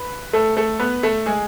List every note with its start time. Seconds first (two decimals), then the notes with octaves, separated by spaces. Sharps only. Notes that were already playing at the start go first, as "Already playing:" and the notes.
Already playing: B4
0.33 A3 A4
0.57 A3 A4
0.79 B3 B4
1.03 A3 A4
1.26 G#3 G#4